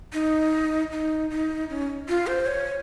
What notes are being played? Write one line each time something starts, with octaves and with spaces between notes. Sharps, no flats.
D#4
D#4
D#4
C#4
F4
C5
C#5